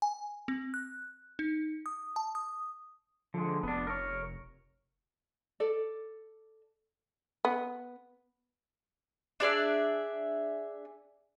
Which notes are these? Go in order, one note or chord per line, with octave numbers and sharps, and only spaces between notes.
G#5
C4
F#6
D#4
D#6
A5
D#6
D3 F3 G#3
F1 B3 D4
A#4 C#5
A4 D5
B3
D4 G#4 D5 E5